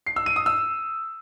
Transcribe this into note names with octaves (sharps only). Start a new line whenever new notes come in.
C7
E6
D#7
D#6
E6